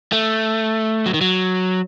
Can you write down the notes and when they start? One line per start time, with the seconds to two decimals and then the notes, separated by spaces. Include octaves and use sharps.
0.12 A3
1.06 F#3
1.14 D#3
1.21 F#3